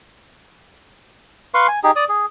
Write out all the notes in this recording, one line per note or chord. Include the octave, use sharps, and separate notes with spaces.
B4 F5 C6 C#6
G#5
D#4 G4 G#4
D5 D#6
G#4